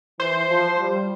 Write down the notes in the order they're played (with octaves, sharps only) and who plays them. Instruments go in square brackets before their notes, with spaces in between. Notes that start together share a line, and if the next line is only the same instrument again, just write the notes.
[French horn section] E3 [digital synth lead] C5
[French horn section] F3
G3